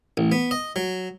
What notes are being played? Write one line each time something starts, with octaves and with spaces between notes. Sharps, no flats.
A1
B3
D#5
F#3